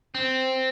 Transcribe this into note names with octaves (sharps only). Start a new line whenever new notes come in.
C4